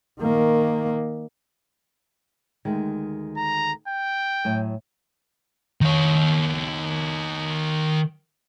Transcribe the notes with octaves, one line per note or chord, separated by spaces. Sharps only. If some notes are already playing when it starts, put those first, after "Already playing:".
D#3 A#3
D2 D#3 G#3
A#5
G5
A2 F#3 G#5
D#3 C#5